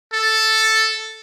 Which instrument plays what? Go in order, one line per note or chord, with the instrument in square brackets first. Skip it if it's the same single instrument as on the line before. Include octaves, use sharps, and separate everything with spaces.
[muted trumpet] A4